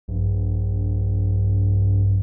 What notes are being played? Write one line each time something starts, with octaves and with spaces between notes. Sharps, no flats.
A#1 G2